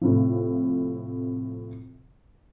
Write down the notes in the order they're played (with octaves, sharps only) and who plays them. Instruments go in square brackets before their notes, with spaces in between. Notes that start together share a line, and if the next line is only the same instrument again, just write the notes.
[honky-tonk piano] A2 C3 F3